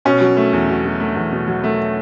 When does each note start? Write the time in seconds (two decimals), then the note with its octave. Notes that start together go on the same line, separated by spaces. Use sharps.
0.05 B2 C#4
0.21 F#3
0.37 A3
0.53 E2
0.68 B2
0.84 F#3
1.00 A3
1.16 E2
1.32 B2
1.47 F#3
1.64 A3